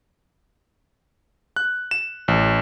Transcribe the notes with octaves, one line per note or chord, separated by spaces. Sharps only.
F#6
E7
A1